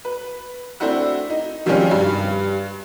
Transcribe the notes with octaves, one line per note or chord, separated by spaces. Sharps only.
B4
A3 C4 D4 E4 F#4
D#4
C3 D#3 F3 G3 G#3 C#4
G2